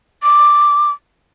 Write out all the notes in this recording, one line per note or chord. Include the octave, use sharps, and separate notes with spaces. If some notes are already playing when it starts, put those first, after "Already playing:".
D6